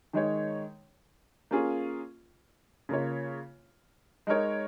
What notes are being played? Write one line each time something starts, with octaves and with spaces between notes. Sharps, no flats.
D#3 G#3 D#4 C#5
A#3 C#4 F4 G#4
C#3 A#3 F4 C#5
G#3 D#4 A#4 C#5